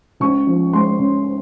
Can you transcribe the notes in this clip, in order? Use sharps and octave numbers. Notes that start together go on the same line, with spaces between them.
C#2 C#6
F3
G#3 C6
C#3